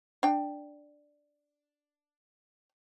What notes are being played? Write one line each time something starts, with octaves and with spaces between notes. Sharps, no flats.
D4 G5